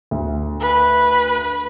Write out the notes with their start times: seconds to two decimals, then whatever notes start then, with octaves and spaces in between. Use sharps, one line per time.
0.11 D2
0.60 B4